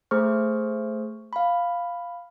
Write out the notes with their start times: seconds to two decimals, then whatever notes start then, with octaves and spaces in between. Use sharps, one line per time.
0.11 A3 G#4 C5 C#6 F6
1.33 F5 B5